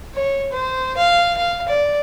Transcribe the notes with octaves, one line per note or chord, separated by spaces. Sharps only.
C#5
C5
F5
F5
D5